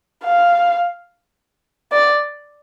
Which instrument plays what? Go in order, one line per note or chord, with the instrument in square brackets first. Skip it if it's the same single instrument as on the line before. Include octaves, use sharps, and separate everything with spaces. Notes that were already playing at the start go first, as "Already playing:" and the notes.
[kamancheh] F5
D5